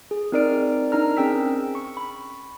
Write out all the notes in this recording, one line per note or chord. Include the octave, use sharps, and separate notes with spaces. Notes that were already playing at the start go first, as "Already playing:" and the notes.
G#4
C4 D#4 A#4 D5 F6 D7
D4 D#4 A#4 A#5 F6
C4 C#4 G#4 G5 E6 B6
C#6
B5